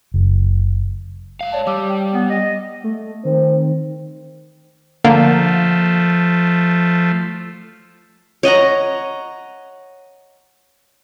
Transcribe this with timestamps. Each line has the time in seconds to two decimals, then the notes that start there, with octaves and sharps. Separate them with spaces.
0.14 F#1
1.41 G#2 D#3 F5
1.52 C#5 D5 A5
1.67 G3 D6 E6
1.90 G5
2.14 B3
2.30 D#5
2.84 A3
3.25 D#3 C4
5.04 D3 F3 A3 A#3
8.43 C#5 D#5 F#5 A#5